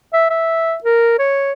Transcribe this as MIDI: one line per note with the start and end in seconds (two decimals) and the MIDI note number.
0.13 0.29 76
0.30 0.75 76
0.84 1.14 70
1.19 1.52 73